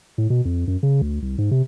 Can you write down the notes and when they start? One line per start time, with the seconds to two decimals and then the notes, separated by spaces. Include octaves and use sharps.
0.18 A2
0.30 B2
0.45 F2
0.68 F#2
0.83 C#3
1.02 D2
1.22 C2
1.38 G#2
1.51 C3